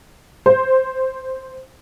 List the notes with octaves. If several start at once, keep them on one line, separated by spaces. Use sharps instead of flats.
C5